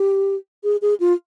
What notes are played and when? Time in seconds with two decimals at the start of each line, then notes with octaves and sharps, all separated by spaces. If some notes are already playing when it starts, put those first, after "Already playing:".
Already playing: G4
0.64 G#4
0.82 G#4
1.00 F4